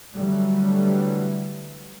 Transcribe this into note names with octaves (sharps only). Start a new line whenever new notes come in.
D3 E3 F#3 G3 A3